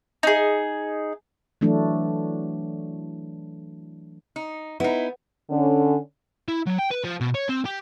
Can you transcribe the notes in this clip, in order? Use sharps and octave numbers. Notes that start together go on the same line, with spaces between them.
D#4 G#4
E3 F#3 A3 D4
D#4
B3 D#4 E4
D3 C#4
E4
F#3
G5
B4
F3
B2
C#5
C4
G4